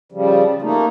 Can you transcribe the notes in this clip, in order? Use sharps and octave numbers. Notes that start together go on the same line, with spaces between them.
C#3 F3 G3
A3 A#3 D#4